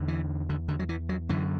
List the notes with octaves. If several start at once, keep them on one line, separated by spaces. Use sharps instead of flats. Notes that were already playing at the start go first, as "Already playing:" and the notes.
Already playing: E2 D3
E3
D3
D3
F#3
E3
F#3
F#2 D3 E3